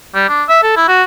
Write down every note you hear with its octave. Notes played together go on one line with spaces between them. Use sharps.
G3
D4
E5
A4
E4
F#4